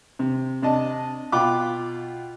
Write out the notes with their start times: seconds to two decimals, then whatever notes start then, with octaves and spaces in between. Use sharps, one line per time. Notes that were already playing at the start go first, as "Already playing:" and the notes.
0.19 C3
0.62 C3 D4 D#5 A5
1.32 B2 F4 G5 B5 D6 F#6